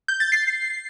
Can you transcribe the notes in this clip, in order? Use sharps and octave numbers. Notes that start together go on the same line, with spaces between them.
G6
A6
C7